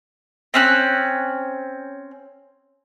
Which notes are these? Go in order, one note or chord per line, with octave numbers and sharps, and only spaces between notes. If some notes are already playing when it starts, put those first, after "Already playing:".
C4 C#4 F#6